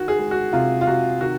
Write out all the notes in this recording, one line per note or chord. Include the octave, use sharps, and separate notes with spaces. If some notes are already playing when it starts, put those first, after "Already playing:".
Already playing: D#3 F#4
G#4
G#3
F#4
C3 F4
F4
C3 F#4
D#3 F#4